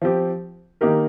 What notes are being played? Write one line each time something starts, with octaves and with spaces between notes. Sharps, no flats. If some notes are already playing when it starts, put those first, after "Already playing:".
F3 C4 G4
D#3 A#3 D#4 G4 A#4